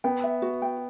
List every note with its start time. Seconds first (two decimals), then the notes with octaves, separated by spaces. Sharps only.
0.04 B3 G5
0.24 E5
0.42 F#4
0.62 G5